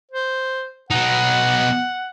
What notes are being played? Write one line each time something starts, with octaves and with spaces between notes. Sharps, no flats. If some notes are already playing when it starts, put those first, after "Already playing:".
C5
B2 D#4 F#5